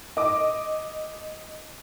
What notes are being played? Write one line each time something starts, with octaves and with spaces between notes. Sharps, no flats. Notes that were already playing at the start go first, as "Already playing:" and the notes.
D#5 D6